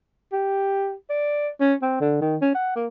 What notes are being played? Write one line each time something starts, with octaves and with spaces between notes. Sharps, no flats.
G4
D5
C#4
C4
D3
D#3
C#4
F#5
A#3